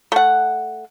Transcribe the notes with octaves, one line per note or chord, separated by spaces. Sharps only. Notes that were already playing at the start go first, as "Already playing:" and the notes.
A3 F#5